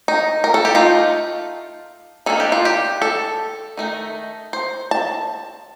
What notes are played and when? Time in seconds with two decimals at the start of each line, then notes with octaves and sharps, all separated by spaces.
0.08 D#4
0.44 A#4
0.54 A4
0.65 G4
0.75 A3 D#4 F4
2.26 D#3 A#3 D4 A4
2.40 G4
2.52 F4
2.65 G4
3.02 A4
3.77 D#3 A3 D#4
4.53 C5
4.91 A5